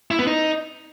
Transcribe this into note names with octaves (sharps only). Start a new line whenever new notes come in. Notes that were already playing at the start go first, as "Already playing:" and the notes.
E4
B3
D#4